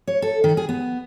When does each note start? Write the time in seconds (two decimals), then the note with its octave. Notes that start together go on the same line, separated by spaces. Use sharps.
0.07 C#5
0.22 A4
0.44 D#3
0.57 G#4
0.69 B3